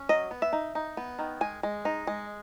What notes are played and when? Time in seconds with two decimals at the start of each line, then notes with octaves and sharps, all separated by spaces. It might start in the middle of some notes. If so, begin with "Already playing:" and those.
Already playing: C#4
0.09 F#3 D#5
0.31 B3
0.42 E5
0.53 D#4
0.75 D#4
0.97 B3
1.19 D#3
1.41 G#3 G#5
1.63 G#3
1.85 D#4
2.07 G#3